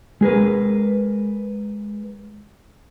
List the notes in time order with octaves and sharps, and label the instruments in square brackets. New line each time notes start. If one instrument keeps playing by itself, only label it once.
[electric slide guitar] G#3 G#4 A#4 B4